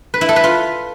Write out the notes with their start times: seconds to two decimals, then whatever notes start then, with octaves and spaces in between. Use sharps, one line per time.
0.14 B4
0.21 E4
0.29 A4
0.36 B4
0.44 F4